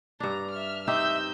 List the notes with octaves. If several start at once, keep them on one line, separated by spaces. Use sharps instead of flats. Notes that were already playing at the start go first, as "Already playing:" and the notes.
G2 D4 A#5
E5 F6
C4 D#4 G4 E5 E6 G6